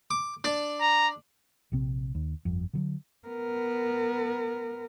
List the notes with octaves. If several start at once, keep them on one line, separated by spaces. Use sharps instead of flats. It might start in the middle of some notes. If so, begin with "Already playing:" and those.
D6
D4 D5
A#5
A#1 C3 C4
D#2
G1 F2
D3 E3 F#3
B3 A#4